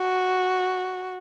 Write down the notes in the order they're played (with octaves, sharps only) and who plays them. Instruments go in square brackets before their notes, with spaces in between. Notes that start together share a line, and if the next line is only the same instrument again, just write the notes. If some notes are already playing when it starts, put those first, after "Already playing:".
Already playing: [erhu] F#4